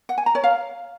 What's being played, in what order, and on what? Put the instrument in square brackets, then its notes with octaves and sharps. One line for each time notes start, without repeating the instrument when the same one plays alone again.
[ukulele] F#5
G#5
A#5
C#5
F5